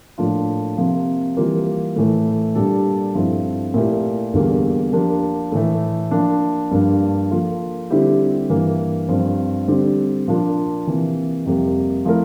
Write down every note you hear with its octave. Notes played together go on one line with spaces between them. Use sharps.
A2 F3 A#3 D4 F4
C3 F3 A#3
E3 G3 A#3 F4
A2 E3 A3
A#2 G3 D4 A4
G2 F3 C4 E4 A4
A#2 A3 E4 G4 A#4
E2 D3 G3 A#3
F3 A#3 D4 G4 A#4
A2 E3 A3
F3 A#3 D4
G2 F3 A#3 D4
F3 A#3 F4 A4
D3 G3 C4 E4 G4
G2 E3 A#3
G2 F3 C4
D3 G3 C4
A#2 F3 A#3 D4 F4
C3 E3 A#3
F2 C3 G3 A#3
F3 A3 E4 A#4